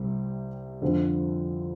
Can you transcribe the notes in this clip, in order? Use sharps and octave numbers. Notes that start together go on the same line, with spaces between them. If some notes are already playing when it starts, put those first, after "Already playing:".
Already playing: C2 C3 G3
F2 D3 F3 C4